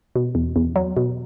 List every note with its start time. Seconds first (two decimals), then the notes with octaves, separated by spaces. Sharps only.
0.16 B2
0.35 E2
0.56 E2
0.76 F#3
0.97 B2